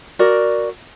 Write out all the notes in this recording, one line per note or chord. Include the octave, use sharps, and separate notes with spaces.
F#4 A#4 D5